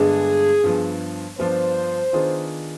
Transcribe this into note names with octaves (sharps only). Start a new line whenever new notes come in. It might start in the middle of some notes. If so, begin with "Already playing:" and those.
Already playing: G2 D3 G#3 B3 D4 G#4
G2 F3 B3
G2 F3 B3 D4 F4 C5
D#3 B3 D4 F4 G#4